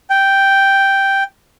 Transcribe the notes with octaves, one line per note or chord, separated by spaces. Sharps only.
G5